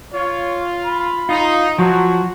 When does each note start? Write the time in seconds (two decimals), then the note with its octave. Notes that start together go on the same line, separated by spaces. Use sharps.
0.14 F4 C#5
0.85 B5
1.29 D#4 F4
1.79 F3 F#3 F#4